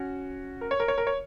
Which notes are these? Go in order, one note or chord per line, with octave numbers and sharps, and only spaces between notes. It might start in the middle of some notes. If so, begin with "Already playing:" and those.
Already playing: C#4 F#4
A#4
C#5
A#4
C#5
A#4
C#5